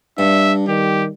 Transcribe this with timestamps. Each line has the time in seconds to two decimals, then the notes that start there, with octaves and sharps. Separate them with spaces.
0.18 G2 D4 E5
0.68 D#3 G4